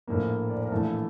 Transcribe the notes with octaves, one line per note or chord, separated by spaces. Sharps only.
A#1 A2 F3 A#3 A#4
D5
C5
A#4
A#1 A2 E3 A3 A4